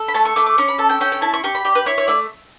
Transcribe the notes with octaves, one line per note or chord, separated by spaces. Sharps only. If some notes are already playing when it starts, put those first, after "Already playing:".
Already playing: A4
B5
A3 A5
C#6
A3 D6
D6
C#4 C#6
B5
A4 A5
G5
C#4 G5
G5
E4 A5
C#6
G4 C#6
B5
G4 D5
B4
E4 C#5
C#5
A3 D5